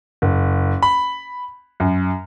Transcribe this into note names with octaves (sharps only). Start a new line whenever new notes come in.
F#1
B5
F#2